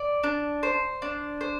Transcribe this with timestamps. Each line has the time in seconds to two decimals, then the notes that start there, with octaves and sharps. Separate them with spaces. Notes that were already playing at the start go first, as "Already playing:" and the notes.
Already playing: D5
0.24 D4
0.63 C5
1.02 D4
1.41 C5